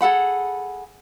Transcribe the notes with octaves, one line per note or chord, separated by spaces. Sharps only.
G#4 A4 F#5 B5